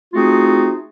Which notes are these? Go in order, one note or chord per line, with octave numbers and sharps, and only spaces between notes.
A3 C4 D#4 F4 F#4 G#4